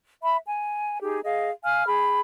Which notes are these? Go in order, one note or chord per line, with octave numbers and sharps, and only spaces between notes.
E5 B5
G#5
D#4 G4 G#4
G#4 D#5 F5
F5 G#5 F6
G#4 B5